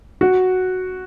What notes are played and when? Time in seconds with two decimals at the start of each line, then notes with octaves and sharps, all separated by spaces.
0.21 F#4